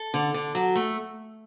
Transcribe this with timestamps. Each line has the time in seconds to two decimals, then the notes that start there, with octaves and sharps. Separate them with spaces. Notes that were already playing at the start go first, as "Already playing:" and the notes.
Already playing: A4
0.14 D3
0.34 D3
0.55 F#3
0.75 A3